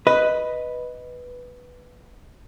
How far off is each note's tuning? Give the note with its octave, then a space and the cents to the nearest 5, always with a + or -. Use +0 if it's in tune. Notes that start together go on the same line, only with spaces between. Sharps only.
B4 +0 D#5 +0